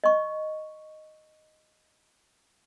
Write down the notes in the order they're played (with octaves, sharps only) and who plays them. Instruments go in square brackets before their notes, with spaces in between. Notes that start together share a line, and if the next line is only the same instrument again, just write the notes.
[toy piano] D#5 C#6